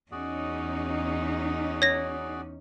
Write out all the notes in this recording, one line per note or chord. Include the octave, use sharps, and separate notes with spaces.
E2 C#4 D#4 F#4 G#4 D5
C#5 A#6